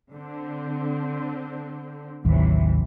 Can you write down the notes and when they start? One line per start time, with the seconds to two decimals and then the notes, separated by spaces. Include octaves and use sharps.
0.12 D3 C4
2.25 A1 D#2 C3 E3 F#3